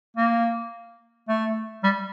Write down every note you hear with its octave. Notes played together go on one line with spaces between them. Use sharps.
A#3
A3
G3